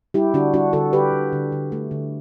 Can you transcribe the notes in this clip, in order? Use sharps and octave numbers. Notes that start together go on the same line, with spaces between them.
G3 E4 G4
D3 D4 F#4
G3 D4 F#4
D3 F#4 A4
D3 G4 B4
D3
D3
D3
A3
D3